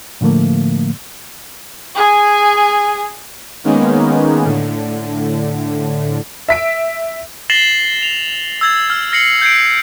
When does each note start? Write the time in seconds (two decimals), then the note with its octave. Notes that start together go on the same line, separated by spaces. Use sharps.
0.21 A2 D3 F3 A3 A#3
1.96 G#4 G#5
3.64 D#3 G#3 A#3 B3 C#4 D#4
4.44 A2 D3
6.48 E5 B6 D7
7.50 A6 A#6 C7 E7 F#7 G7
8.02 F7
8.61 E6 G#6 A6
8.90 F6
9.12 F6 A#6 C7 C#7 F#7
9.42 G6 G#6 C7 D7